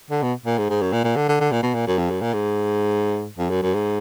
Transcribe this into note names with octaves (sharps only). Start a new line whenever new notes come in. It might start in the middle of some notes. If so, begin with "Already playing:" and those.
D3
B2
A#2
G#2
G#2
F#2
A#2
A#2
D3
D3
D3
A#2
B2
A#2
F#2
F2
F#2
A#2
G#2
F2
F#2
F#2
G#2